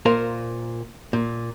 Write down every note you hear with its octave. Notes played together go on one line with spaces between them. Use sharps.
A#2 A#4 C5 F5
A#2